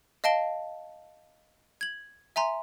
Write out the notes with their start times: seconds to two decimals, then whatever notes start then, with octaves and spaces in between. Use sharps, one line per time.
0.24 D#5 F5 A5 D7 G7
1.81 G#6 F#7
2.36 E5 G#5 A#5 C6